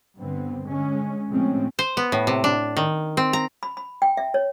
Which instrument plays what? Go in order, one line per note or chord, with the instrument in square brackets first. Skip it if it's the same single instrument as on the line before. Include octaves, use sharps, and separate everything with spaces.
[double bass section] G2 D3 B3 C4
D3 G#3 C#4
A2 F3 G#3 C4 C#4
[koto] C5
B3
A2
C3
D4
D#3
C4
A#5
[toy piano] B5
B5
G5
E5
C#5